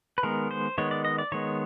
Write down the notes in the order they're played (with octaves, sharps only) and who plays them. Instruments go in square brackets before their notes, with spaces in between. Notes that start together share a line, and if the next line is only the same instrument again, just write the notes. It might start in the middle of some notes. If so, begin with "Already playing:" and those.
[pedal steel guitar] B4
D#3 G#3 B3 A#4
C5
D#3 G#3 B3 C#5
D5
D#5
D5
D#3 G#3 B3 C#5